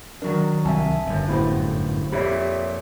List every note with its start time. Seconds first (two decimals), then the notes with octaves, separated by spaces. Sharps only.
0.22 D#3 F#3 D4 A#4
0.65 C2 E5 G#5 A5
1.06 G1 F#2
1.28 A2 B3 E4 G4 C5
2.12 F2 A#2 G4 C#5 E5 B5